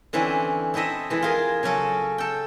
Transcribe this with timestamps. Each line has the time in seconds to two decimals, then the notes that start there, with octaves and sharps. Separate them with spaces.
0.13 D3 E3 C4 C#4
0.74 C4 E4 A4 D#5 E5
1.10 E3 G#3
1.23 F4 G#4 A#4
1.63 C#3 F#3 C#4 A4
2.18 A4 G5